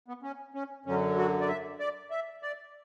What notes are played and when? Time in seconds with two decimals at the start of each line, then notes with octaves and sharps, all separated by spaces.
0.08 B3
0.23 C#4
0.54 C#4
0.86 F#2 D3 F#3 C#4
1.17 F#4
1.40 D5
1.48 E5
1.80 D5
2.11 E5
2.43 D5